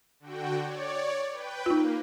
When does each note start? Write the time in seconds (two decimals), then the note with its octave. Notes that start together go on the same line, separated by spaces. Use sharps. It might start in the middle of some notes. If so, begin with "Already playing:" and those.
0.20 D3 F#4 G5
0.59 C#5 D5
1.31 B4 G5
1.66 A#3 D#4 F4